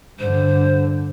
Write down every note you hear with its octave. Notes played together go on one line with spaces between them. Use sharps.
G2 D3 C5